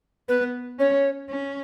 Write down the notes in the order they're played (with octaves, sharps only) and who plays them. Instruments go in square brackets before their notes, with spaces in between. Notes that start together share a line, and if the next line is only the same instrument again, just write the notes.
[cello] B3 [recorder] B4
[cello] C#4 [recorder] C#5
[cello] C#4